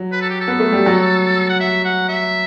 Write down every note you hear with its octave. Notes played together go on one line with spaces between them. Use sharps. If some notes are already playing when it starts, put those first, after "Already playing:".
Already playing: F#3
B4
A4
G4
A4
B3
A3
G3
F#3
F#5
E5
F#5
E5